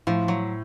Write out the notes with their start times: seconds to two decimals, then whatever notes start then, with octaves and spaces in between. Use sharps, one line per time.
0.07 A2 F3
0.28 F#3